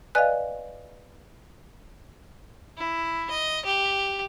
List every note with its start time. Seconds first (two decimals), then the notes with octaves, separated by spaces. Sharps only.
0.15 B4 D5 D#5 F5 G#5 F#6
2.78 E4
3.30 D#5
3.65 G4